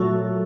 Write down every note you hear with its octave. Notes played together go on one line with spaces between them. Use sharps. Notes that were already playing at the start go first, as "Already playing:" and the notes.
Already playing: A#2 F#3 A3 F#4 A4